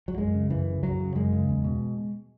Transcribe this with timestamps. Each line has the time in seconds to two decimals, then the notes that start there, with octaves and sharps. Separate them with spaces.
0.08 F#3
0.18 F#2 G#3
0.34 C#3
0.50 F#2 E3
0.67 C#3
0.83 F#2 F#3
1.00 C#3
1.15 F#2 G#3
1.33 C#3
1.49 E2
1.64 B2